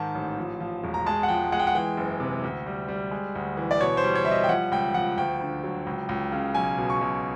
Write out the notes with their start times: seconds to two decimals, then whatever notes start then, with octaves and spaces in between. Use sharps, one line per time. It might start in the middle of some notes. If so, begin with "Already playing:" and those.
Already playing: G#2 D#3 A5
0.15 A1
0.38 F3
0.60 F3
0.84 E1
0.94 A#5
1.06 G#3 A5
1.23 F#5
1.29 F3 G5
1.52 G#3 F#5
1.59 G5
1.67 F#5
1.75 E3 G5
1.97 F#1
2.20 C3
2.44 D2
2.67 G3
2.88 G3
3.11 G#3
3.35 D2
3.57 E3
3.71 D5
3.81 B2 C#5
3.97 C5
4.04 G3
4.15 C#5
4.25 G3 E5
4.31 D#5
4.44 G5
4.48 F3 F#5
4.72 C#2 G5
4.94 F3 F#5
5.18 D2 G5
5.41 D3
5.64 F#3
5.87 C#2
6.09 C#2
6.32 C#3
6.55 B1 G#5
6.78 B2
6.90 C#6
7.01 B1